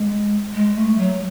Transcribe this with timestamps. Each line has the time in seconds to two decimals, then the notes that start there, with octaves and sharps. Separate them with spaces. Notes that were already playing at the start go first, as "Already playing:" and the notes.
Already playing: G#3
0.54 G#3
0.75 A3
0.99 F#3